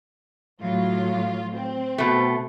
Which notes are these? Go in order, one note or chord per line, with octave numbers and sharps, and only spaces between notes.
A2 F#3 F4
C4
B2 A3